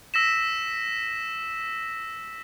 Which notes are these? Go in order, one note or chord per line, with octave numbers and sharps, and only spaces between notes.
E6 A#6 B6 E7